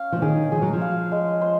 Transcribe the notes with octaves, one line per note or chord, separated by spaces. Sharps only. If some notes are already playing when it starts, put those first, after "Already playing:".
Already playing: C#4 F5
F3
D#3 G#4
F3 G#4
F#3
F3
F5
G#3
C5